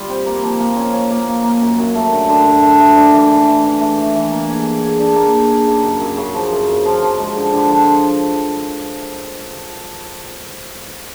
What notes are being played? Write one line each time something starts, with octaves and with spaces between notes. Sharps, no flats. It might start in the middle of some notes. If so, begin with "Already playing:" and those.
Already playing: G3 F4
C4
A#3
F3
A#3
C#4
C#4
A#3
A#3
A#3
F#2
F#2
A3
D3
D3
F#2
A3
A3
D4
E3
E3
E3
E3
A3
E3
E3
A#3
G#4
G#4
G#4
D4
A#3
G#4
G#4
C#3
F#2
F#2
C#3
F3
F#2
F#2
F3
F3
G#3
D3
D3
F3